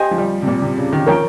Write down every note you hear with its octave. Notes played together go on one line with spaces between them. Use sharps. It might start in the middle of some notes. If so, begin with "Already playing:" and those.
Already playing: G4 C5 D#5 G#5
F3
G3
C3
A#2
C3
C#3
D#3
F3 A#4 C#5 G5